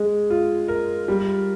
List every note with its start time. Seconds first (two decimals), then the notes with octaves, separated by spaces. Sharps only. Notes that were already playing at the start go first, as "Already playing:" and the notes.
Already playing: G#3
0.30 F4
0.68 A#4
1.08 G3